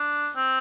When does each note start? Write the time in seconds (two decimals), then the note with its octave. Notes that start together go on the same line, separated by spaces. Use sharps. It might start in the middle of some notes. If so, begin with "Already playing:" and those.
Already playing: D4
0.36 C4